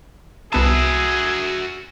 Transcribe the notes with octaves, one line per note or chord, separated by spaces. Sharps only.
C2 B3 F#4 G#4 E5 A5